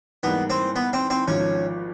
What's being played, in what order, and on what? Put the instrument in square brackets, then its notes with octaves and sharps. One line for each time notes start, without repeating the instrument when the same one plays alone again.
[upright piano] G#2 E3 G3 A#3 [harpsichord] B3
[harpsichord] C4
B3
C4
C4
[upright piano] G#1 G#2 F3 [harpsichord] C#4